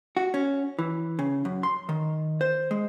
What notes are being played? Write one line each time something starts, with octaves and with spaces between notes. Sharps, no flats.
F#4
C#4
E3
C#3
F#2
C6
D#3
C5
G#3